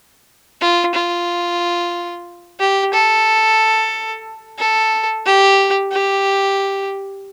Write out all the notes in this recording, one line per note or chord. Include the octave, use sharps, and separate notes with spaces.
F4
F4
G4
A4
A4
G4
G4